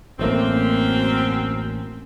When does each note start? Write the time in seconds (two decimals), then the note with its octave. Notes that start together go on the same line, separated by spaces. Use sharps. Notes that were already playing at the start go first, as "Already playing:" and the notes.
0.19 A1 F#2 A3 A#3 C4